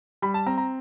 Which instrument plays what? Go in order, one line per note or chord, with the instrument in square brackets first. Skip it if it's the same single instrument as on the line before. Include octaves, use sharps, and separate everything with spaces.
[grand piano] G3 B5
A5
C4 A#5
A#5